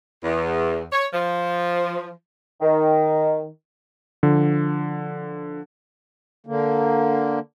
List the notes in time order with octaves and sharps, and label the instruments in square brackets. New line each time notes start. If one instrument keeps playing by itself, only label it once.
[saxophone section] E2
C#5
F3
[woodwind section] D#3
[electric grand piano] D3 F3
[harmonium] D3 A#3